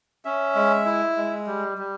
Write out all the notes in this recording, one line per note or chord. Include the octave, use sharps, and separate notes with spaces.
C#4 E5
G#3
E4
G#3
G3
G3